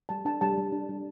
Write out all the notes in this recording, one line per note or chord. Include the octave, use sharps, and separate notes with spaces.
G3 A5
D4 A5
G3 A5
G3
D4
G3